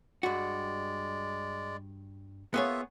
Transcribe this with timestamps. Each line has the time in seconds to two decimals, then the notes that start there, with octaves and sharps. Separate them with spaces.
0.23 G2 G#3 F#4 D5
2.54 A#3 B3 F4 G#4 C#5 E5